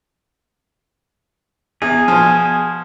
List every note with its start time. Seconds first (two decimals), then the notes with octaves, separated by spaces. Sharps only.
1.82 E2 G#4
2.08 B2 F3